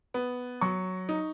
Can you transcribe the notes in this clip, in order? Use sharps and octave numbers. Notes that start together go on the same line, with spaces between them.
B3
F#3 C#6
D#4